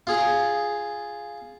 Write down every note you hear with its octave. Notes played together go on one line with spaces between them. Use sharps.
F4 G#4